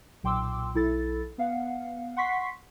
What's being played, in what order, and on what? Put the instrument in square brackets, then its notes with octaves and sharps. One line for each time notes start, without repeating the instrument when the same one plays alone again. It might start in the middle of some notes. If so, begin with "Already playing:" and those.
[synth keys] B1 A#2 G5 C6 D6 E6
B1 E4 A4 A6
B3 F5 F#5
F#5 C6 C#6 B6 C7